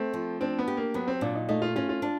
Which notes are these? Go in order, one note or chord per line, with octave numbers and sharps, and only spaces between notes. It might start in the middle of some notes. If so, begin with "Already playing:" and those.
Already playing: A3 C4
F3
C4 D4
B3
G4
A#3
F#3 B3
C4
A#2 D4
D#4
A3 D#4
F4
C#4 F4
F4
D4